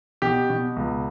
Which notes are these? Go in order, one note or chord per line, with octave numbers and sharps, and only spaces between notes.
B2 G4
B2
C#2